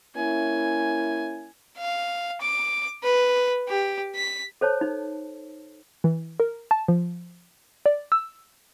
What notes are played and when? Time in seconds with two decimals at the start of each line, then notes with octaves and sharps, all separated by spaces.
0.16 A#3 C#4 E4 G#5
1.78 F5
2.41 D6
3.03 B4
3.69 G4
4.16 B6
4.61 A4 C5 C#5 A5
4.81 D#4
6.04 E3
6.40 A#4
6.71 A5
6.88 F3
7.86 D5
8.12 E6